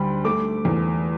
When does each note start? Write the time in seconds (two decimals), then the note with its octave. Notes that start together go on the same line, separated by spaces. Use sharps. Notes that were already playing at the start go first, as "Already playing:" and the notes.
Already playing: D2 G3 B5
0.25 A3 D6
0.65 E2